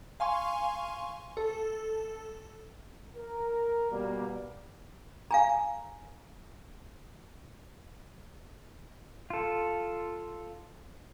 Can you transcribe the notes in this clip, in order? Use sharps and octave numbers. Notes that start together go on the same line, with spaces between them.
F5 G#5 C6 C#6
A4
A#4
B2 G3 A#3
F5 G#5 A#5
F4 A4